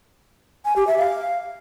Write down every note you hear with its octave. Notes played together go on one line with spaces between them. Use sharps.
G#5
G4
E5
F5